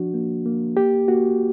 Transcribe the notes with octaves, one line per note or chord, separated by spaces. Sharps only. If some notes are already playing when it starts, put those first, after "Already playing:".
Already playing: F3 D4 F#4
A#3
A#3
A#3 G4
A#3 F#4